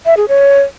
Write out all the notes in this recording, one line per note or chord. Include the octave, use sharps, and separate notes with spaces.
E5
G#4
C#5